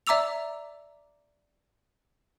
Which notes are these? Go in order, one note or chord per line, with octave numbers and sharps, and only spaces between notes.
D5 E5 A#5 D6 E6 F7